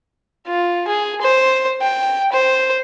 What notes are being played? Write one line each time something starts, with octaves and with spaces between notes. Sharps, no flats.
F4
G#4
C5
G5
C5